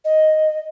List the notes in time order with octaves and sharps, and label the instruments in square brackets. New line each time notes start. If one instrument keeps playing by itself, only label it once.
[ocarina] D#5